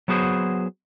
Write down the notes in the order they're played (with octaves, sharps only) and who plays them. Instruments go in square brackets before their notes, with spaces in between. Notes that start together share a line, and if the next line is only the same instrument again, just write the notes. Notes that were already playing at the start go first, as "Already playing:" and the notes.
[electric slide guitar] F#3 B3 F#4 G#4 C5